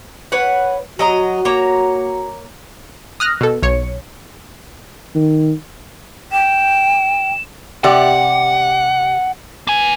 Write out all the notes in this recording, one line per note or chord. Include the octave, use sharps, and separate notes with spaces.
B4 C#5 F#5
F#3 F#4 D#5 A#5
A#3 C#5 A#5
D#6 F6 F#6 A#6
B2 A4
B1 C#5 C#7
D#3
G5 E7
C3 G4 D5 F#5
A#3 G#5